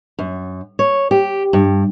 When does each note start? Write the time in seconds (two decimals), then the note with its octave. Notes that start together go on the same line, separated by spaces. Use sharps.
0.19 F#2
0.79 C#5
1.11 G4
1.53 G2